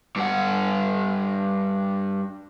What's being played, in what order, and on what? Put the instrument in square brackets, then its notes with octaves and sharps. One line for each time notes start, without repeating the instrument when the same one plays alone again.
[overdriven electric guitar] G2 F#5